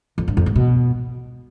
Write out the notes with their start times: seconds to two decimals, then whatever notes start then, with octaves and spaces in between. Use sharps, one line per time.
0.18 F2
0.28 G2
0.37 F2
0.46 G2
0.56 B2